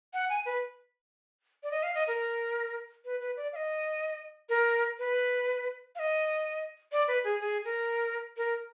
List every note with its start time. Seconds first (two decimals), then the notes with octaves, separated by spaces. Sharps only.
0.14 F#5
0.30 G#5
0.46 B4
1.63 D5
1.71 D#5
1.83 F5
1.95 D#5
2.07 A#4
3.05 B4
3.20 B4
3.37 D5
3.53 F5
3.56 D#5
4.49 A#4
4.99 B4
5.95 F5
5.99 D#5
6.92 D5
7.08 B4
7.24 G#4
7.41 G#4
7.65 A#4
8.37 A#4